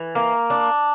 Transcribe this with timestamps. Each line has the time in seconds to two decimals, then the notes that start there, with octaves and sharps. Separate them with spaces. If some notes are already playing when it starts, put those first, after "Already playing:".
Already playing: E3
0.15 A#3
0.50 D4